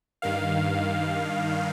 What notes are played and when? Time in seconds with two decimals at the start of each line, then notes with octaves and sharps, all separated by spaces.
0.22 G2 D#3 F5